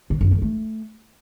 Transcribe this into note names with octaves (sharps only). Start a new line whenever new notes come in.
C3
F#2
G2
A3